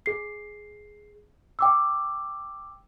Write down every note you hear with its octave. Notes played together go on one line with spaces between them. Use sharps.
G#4 C7
G5 D6 E6